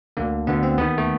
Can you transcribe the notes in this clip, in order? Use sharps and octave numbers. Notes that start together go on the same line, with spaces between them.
D2 D3 A#3
D2 D3 B3
C4
D#2 D#3 B3
A3